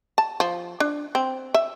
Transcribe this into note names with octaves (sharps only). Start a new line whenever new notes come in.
A5
F3
D4
C4
E5